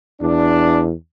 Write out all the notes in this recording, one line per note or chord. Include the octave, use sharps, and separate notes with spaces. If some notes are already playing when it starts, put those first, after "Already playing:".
E2 D4